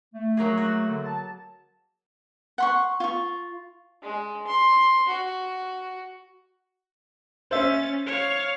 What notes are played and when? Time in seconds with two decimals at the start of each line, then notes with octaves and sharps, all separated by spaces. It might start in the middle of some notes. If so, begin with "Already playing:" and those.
0.14 A3
0.37 F#3 A#3 G#4
0.57 F#4
0.88 D3
1.04 A5
2.58 F#5 C6 C#6
3.00 F4 C#6
4.02 G#3
4.47 C6
5.08 F#4
7.51 C#4 C5 E5 A6
8.07 C#5 F5